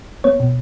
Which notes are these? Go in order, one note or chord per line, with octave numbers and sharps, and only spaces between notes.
B3 C#5
B2